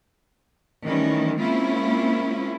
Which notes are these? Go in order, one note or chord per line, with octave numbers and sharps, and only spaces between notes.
D#3 E3 G3 A3 C#4 D4
G#3 A#3 C4 C#4 E4 F4